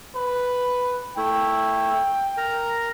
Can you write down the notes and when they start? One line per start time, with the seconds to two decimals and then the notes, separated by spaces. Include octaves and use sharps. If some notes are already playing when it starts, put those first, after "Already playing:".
0.15 B4
1.17 A3 E4 G5
2.37 A#4 A#5